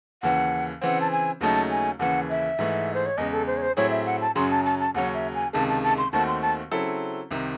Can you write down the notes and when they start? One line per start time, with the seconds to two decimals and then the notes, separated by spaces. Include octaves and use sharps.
0.23 D#2 C#3 E3 F#5
0.82 C#3 E3 C4 F#5
1.01 A5
1.11 G#5
1.41 D#2 C#3 F#3 A3 D#4 A5
1.70 G#5
1.99 D#2 C#3 E3 F#5
2.30 E5
2.59 G#2 E3 A3
2.94 C5
3.06 C#5
3.18 E2 C#3 G#3 D#5
3.33 A4
3.47 C5
3.57 C#5
3.62 C5
3.77 A2 F#3 C4 E4 G#4 C#5
3.91 E5
4.06 F#5
4.21 A5
4.35 F#2 C#3 F#3 C#4 G#4 C6
4.51 A5
4.65 A5
4.80 A5
4.94 D#2 C#3 F#3 C#4 F#5
5.14 E5
5.34 G#5
5.53 C#2 C3 D#3 G#3 A5
5.69 A5
5.83 A5
5.98 C6
6.13 D#2 D#3 A3 C4 F#4 A5
6.27 C6
6.42 A5
6.71 C#3 F#3 C4 E4 A4
7.31 C2 C3 D#3